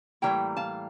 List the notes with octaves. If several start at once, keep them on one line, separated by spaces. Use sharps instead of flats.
A2 E3 G3 A#3 G5 A#5
F5 A5